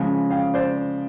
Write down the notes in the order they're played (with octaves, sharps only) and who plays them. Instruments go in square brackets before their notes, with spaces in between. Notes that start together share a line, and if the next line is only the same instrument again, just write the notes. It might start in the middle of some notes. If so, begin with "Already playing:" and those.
Already playing: [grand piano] C#3 F3 G#3
F5 G5
C5 D5